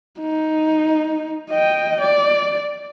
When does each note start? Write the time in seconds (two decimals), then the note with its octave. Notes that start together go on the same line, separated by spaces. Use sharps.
0.21 D#4
1.50 D#5 G5
2.01 D5